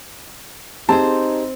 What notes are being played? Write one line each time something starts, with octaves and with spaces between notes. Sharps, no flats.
C4 D#4 G4 G#4 C5 A5